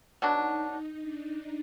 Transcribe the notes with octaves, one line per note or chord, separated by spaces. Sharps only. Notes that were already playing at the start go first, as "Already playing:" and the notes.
B2 F#3 D4 D#4
D#4
D4